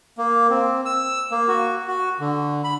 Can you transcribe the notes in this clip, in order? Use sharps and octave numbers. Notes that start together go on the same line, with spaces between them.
A#3
C4
E6
A#3
F#4
F#4
D3
B5